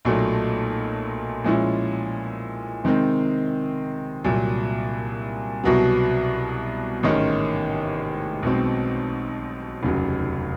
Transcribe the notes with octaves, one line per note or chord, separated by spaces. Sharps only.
B1 A#2 F#3 A3
A#2 F3 G#3 C#4 E4
C3 D#3 G#3 C4 D#4
C2 A#2 F#3
C2 B2 F#3
A1 G#2 D#3 G#3 C#4
B1 B2 G#3 C4
F1 D#2 C#3 F#3